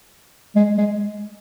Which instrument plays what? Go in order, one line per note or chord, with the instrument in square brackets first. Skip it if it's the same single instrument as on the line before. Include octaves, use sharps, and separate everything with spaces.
[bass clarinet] G#3
G#3